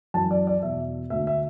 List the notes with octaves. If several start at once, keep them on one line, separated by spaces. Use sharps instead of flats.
F#2 E3 A5
D5
D5
E2 B2 E5
D2 D3 E5
E5